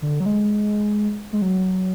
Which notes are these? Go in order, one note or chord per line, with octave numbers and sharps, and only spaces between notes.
D3
F#3
G#3
G#3
F#3